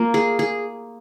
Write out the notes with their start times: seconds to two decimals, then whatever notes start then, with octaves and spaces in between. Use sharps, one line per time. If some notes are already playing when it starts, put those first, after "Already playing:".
Already playing: A#3 F4
0.14 G#4
0.39 G#4